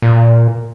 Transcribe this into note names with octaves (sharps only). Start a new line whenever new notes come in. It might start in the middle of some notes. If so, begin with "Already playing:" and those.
A#2